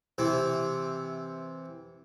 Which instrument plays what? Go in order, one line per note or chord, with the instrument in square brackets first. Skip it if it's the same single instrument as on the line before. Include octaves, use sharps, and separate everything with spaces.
[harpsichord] C3 E3